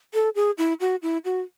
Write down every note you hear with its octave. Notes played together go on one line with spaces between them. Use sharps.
A4
G#4
E4
F#4
E4
F#4